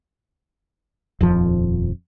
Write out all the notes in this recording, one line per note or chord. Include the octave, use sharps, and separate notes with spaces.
D#1 F2 F3